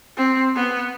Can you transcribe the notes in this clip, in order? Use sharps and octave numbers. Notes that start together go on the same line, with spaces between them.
C4
B3